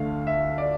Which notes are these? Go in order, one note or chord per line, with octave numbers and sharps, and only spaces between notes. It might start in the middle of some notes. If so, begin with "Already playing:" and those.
Already playing: D2 D3 A3 F5
E5
D5